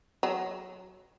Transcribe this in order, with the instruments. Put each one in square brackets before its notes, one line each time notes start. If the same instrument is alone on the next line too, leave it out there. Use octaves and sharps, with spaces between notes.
[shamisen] F#3